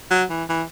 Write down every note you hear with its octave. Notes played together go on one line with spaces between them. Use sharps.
F#3
E3
E3